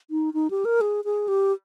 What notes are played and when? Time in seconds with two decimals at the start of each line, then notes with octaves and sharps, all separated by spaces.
0.10 D#4
0.34 D#4
0.50 G4
0.65 A#4
0.81 G#4
1.05 G#4
1.28 G4